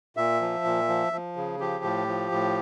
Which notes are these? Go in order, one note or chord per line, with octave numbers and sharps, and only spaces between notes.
A#2 E5
F3
A#2
F3
F3
C#3
F3 G4
A2
F3
A2